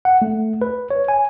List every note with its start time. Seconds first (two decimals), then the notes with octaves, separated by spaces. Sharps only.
0.05 F#5
0.22 A3
0.62 B4
0.91 C#5
1.08 G#5